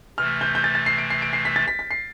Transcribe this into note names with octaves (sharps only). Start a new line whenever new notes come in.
C3 E3 A3 F6
G6
G6
A6
A6
C7
D7
C7
D7
C7
B6
A6
B6
B6
C7